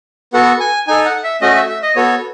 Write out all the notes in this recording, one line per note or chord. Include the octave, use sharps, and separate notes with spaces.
B3 F#4 A4 F#5
G#5
D#4 A4 G#5
F#5
E5
A3 C#4 F#4 D#5
E5
E5
D#5
B3 F#4 A4 C#5